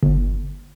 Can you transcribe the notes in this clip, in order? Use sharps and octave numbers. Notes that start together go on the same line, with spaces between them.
G1